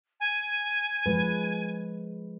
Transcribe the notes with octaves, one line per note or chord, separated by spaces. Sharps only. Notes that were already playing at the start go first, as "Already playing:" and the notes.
G#5
F3 G#3 B4